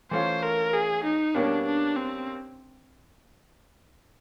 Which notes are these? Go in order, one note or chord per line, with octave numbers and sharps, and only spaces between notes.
E3 A3 C#4 F4 C5
A#4
G#4
D#4
B2 G3 A#3 C#4 D4
D4
C4